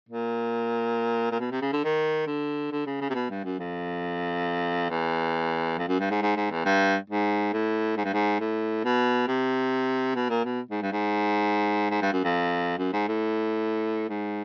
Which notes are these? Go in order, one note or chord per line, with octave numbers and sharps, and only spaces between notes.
A#2
A#2
B2
C3
C#3
D3
D#3
D3
D3
C#3
C#3
C3
B2
G2
F#2
F2
E2
F2
F#2
G2
G#2
G#2
G#2
E2
G2
G#2
A2
G#2
G2
G#2
A2
B2
C3
B2
A#2
B2
G#2
G2
G#2
G#2
G2
F#2
F2
F#2
G#2
A2
G#2